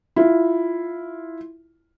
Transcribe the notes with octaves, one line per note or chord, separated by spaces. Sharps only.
E4 F4